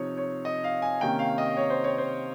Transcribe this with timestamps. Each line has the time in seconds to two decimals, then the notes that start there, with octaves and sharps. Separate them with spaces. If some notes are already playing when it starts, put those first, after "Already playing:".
Already playing: C3 F3 D#4 C#5
0.17 C#5
0.45 D#5
0.64 F5
0.82 G#5
1.01 C3 D#3 A#3 C#4 G5
1.19 F5
1.38 D#5
1.57 C#5
1.70 C5
1.84 C#5
1.98 C5